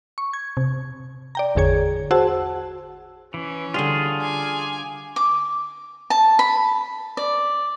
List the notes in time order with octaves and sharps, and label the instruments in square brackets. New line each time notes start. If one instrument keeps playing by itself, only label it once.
[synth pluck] C#6
G#6
C3
D5 G5 A#5
G#1 E2 D3 G#4 C#5 G#6
F#4 G#4 C5 F#5 A5 E6
[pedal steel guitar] E3 [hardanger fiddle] C#4
[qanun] D3 G3 [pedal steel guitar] F4 G#4
[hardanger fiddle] G#5 D6
[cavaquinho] D6
A5
B5
D5